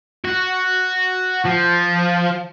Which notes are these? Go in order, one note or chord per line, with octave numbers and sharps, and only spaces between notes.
F#4
F3